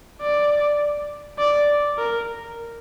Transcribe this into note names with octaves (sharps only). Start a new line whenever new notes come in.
D5
D5
A#4